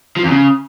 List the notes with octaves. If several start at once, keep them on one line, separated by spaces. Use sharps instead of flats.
F3
E2
C#3